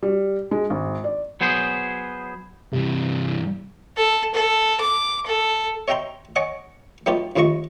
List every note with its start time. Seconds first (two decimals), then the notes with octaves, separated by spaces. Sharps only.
0.03 G3
0.51 G#3
0.70 G#1
1.04 D5
1.41 F#3 B3 G#4 C5
2.73 G2 C3 E3
3.97 A4
4.34 A4
4.80 D6
5.26 A4
5.88 C#5 D#5 E5 G5 A#5 C6
6.36 C#5 D#5 F#5 G#5 D6 D#6
7.06 F#3 A3 B3 D#4 F4 G4
7.36 A#1 D#2 F3 A3 D#5 C#6